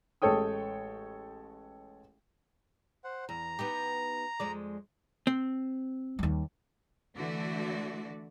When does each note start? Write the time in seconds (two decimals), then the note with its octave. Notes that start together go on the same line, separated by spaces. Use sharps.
0.22 A1 G#3 A4 C#5 G5 D#6
3.04 C5 F#5
3.29 E2 A#5
3.59 B3 D#4 G4
4.40 F2 G#3 D5
5.27 C4
6.19 D#2 G3
7.15 D3 E3 A3 F#4 D5